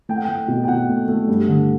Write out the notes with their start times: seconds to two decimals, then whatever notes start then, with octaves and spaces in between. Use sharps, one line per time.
0.09 A3 G5
0.16 F#5
0.24 A3 G5
0.48 B2
0.64 G5
0.68 B2 F#5
0.89 A3
1.08 A3
1.28 G2
1.48 D3